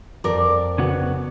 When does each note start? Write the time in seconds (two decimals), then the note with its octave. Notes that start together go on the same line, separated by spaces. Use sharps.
0.24 F2 A#4 D5
0.78 C#3 B3 F#4